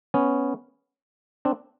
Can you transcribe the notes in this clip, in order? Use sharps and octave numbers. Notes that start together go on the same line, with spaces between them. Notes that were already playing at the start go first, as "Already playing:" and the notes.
B3 C#4
C4 D4